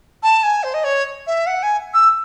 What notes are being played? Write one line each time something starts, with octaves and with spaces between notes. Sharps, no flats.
A5
G#5
C5
D#5
C#5
E5
F#5
G#5
E6